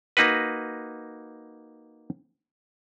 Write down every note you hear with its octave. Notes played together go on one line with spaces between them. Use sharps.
A#3 D#4 F#4 B4